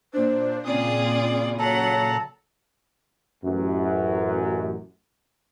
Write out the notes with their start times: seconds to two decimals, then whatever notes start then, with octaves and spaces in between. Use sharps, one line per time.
0.13 A#2 D4 C5
0.65 A#2 C#3 C4 F4 G#4 D5 D#6
1.59 F#3 A4 C#5 F#5 A5 A#5
3.44 A1 F#2